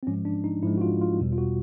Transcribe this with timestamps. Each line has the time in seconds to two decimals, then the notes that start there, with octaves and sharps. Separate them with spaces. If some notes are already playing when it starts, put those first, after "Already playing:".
0.03 C4
0.07 G#2 F3 G#3 C#4
0.25 D4
0.44 D#4
0.63 G#2 F3 G#3 E4
0.78 F#4
0.81 F4
1.01 F4
1.20 E2 B2 G3
1.32 F4
1.38 F#4